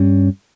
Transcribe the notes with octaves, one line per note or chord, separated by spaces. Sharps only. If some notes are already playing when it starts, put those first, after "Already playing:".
Already playing: G2 G3 C#4